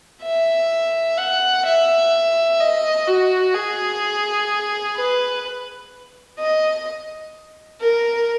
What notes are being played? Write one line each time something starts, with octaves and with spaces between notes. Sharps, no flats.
E5
F#5
E5
D#5
F#4
G#4
B4
D#5
A#4